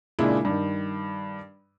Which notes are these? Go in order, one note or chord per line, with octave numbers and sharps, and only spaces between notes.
A#2 C#3 G#3 D4 E4
G2 D#3